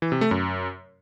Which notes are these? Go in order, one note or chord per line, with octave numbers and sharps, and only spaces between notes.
E3
C3
A3
F#2